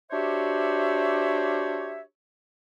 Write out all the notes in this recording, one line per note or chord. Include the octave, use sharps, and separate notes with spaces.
D4 F#4 G4 C5 C#5 E5